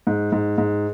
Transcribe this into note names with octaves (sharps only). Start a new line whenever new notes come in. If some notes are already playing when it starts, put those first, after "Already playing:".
G#2
G#2
G#2